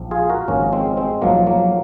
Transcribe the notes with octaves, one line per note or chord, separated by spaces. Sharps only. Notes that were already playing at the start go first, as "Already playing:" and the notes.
Already playing: A#1 G#2 F3
F4 G#4
F#4 A#4
G#1 G#2 F3 A#3 C#4
G#3 C4
G#3 C4
A#1 G#2 F3 F#3 A#3
F#3 A#3